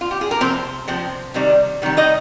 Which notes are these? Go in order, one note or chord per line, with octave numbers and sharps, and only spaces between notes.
F4
G4
G#4
A#4
C3 F3 C4 C5
C3 F3 C4
C3 D#3 G3
C3 D#3 G3
D#4 D#5